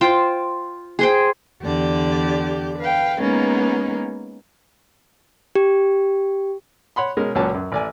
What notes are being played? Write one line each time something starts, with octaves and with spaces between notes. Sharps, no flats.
F4 C5 G5
G#4 C5 G5
E2 D3 G4 D5
B4 F5 G5
G#3 A#3 B3 C#4 D#4
G4
C#5 F#5 B5 C6
B2 G#3 C#4 A#4
C#2 A#2 F#3 C#4 A5
F#2
A1 D5 G#5